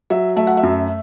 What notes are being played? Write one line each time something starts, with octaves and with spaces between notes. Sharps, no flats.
F#3 E5
A3 E5
F#5
E5
F#2